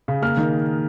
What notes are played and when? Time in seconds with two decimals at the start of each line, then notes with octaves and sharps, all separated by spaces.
0.08 C#3
0.22 A#3 F6
0.37 D#3